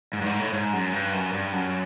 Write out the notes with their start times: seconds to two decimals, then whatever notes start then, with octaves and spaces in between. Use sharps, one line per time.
0.13 G#2
0.21 G2
0.26 G#2
0.39 A2
0.53 G#2
0.73 F#2
0.93 G2
1.13 F#2
1.33 G2
1.52 F#2